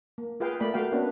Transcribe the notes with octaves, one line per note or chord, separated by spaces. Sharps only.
A#3
F4 G#4 B4 F5 G5
A3 A#3 D5 B5
A3 A#3 F#4 F5 G5
A#3 B3 C#4 D4 F#4 B4